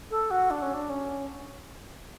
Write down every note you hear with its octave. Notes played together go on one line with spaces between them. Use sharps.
A4
F#4
D4
C#4
D4
C#4